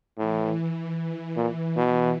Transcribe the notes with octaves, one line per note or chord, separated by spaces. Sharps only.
A2 E3
E3
A#2
B2